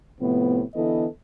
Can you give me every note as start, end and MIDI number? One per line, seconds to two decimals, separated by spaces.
0.20 0.62 45
0.20 0.62 48
0.20 0.62 53
0.20 0.62 59
0.74 1.06 50
0.74 1.06 52
0.74 1.06 59
0.74 1.06 64
0.74 1.06 69
0.74 1.06 75